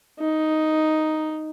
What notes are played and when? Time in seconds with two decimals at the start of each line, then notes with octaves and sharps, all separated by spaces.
0.20 D#4